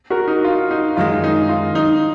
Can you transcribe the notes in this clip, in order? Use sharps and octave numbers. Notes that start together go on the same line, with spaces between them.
F#4 A#4
D#4
F4
D#4
F#2 D#3 G#3 F4
D#4
F4
D#4